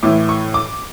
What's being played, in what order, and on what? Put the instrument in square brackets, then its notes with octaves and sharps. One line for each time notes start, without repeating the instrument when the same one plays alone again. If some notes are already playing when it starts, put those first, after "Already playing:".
[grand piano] A2 E3 A3 D6
C#6
D6